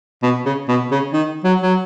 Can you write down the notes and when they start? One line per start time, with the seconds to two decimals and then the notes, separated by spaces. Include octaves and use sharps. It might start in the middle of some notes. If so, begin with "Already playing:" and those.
0.23 B2
0.46 C#3
0.68 B2
0.91 C#3
1.13 D#3
1.44 F#3
1.62 F#3